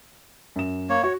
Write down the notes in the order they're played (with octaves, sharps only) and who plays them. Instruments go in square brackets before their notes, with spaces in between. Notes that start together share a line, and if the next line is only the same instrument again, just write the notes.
[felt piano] F#2 E7
[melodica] A#3 C#5
[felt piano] F#4 [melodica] C#5